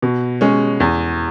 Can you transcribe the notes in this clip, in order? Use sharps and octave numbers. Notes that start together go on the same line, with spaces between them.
B2
G#3 C#4
E2